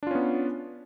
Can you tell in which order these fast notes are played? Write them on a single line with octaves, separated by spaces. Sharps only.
D4 F4 C#4 B3